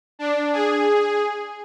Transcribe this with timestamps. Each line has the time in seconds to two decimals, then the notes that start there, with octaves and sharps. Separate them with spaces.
0.19 D4
0.53 G#4